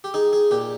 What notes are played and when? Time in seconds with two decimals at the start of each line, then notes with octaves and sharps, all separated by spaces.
0.04 G4
0.14 D#4 G#4
0.33 G#4
0.51 A#2 G4